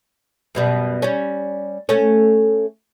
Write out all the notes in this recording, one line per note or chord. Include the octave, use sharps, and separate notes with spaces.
F#2 B2 G3
G3 C#4
A3 C#4